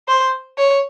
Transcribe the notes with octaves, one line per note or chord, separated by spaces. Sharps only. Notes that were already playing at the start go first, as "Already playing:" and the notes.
C5
C#5